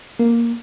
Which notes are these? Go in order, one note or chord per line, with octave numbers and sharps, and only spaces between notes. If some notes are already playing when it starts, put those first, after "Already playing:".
A#3